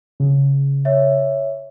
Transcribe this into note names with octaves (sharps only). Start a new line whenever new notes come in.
C#3
C#5 E5